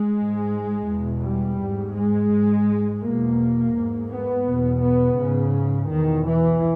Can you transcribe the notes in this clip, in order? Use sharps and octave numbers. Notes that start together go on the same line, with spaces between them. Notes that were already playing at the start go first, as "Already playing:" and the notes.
Already playing: G#3
G#2
E2 B2
G3
G#2
G#3
G#2
E2 B2 A#3
G#2
B3
E2 B2
B3
G#2 C#3
E2 B2 D#3
E3